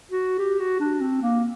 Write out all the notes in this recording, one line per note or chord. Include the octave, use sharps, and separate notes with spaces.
F#4
G4
F#4
D4
C4
A#3